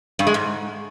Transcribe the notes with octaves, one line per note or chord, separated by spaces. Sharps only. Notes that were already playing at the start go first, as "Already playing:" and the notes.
G2
G#3
G#2